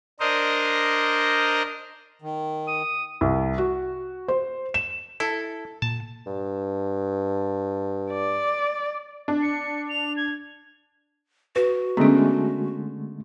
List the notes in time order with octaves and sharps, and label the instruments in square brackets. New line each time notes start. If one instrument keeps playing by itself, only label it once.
[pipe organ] D4 A#4 C5 D#5
[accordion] D#3
[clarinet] D#6
[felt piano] C2
F#4
C5
E7
[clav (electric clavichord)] E4 [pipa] A4
[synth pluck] A#2 [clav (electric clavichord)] A5
[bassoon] G2
[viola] D5
[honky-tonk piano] D4
[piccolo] C#7
F7
G#6
[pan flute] F#4 [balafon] B4
[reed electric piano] D3 G#3 A3 [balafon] B3 C#4